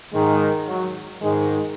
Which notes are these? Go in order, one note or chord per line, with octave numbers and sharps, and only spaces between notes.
G#2 D#3 G#3
F#3
G#2 D#3 G#3